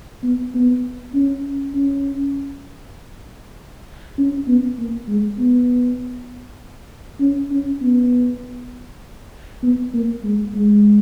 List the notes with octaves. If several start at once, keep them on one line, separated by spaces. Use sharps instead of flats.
B3
B3
C#4
C#4
C#4
B3
A#3
G#3
B3
C#4
C#4
B3
B3
A#3
G#3
G#3